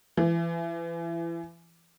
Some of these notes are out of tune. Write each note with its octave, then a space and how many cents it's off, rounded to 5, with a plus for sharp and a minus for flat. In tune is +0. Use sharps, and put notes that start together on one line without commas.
E3 +30